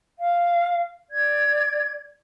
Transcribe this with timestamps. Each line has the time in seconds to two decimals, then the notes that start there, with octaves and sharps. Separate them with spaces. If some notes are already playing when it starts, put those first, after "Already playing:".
0.18 F5
1.10 D5 G#6